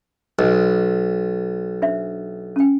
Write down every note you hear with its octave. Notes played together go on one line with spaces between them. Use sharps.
B1 D#5
D4 C5 E5
C#4 G5